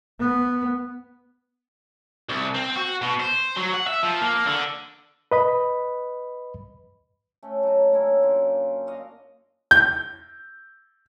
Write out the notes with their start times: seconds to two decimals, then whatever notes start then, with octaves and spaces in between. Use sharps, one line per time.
0.20 B3
2.29 C2
2.55 C4
2.76 F#4
3.02 B2
3.20 C5
3.56 F#3
3.73 F#5
3.87 E5
4.03 F3
4.21 A#3
4.47 D3
5.32 B4 D#5 B5
7.43 A3 C#4
7.63 F#3 D#4
7.92 D3 A#3 C#4 E4
8.22 F#2 F4 G4
8.87 F#4 D5 D#5 F5
9.71 G6